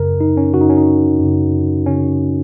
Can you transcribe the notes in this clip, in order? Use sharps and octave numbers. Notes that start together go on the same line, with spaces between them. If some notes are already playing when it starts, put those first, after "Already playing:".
Already playing: F#2 C#3 A#4
D#4
C#4
F#2 C#3 D#4 F#4
C#4
D#4
F#2 C#3
C#3 C#4